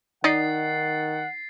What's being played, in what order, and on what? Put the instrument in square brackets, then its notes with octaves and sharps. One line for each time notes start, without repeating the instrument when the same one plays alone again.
[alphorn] D#3 [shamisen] D#4 D5 D#5 [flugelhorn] F#5 [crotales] A6 C7